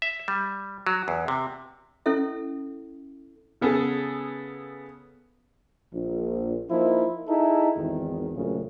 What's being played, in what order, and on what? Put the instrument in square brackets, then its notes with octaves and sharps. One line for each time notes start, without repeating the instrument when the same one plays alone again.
[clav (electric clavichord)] E5
G3
F#3
E2
C3
[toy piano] C#4 E4 A4 E5
[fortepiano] C#3 B3 G#4 A4
[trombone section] A#1
F3 A#3 D#4 E4
D#4 E4 G#4 A4
G#1 E2 D#3
A#1 F#2 A2 C#3